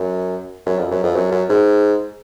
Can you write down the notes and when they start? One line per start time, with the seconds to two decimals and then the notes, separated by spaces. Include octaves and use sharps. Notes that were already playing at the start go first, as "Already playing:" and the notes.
Already playing: F#2
0.66 F#2
0.78 F2
0.91 F#2
1.04 F2
1.15 F#2
1.31 F#2
1.49 G#2